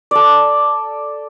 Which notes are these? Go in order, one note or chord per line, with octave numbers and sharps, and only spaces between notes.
A4 D5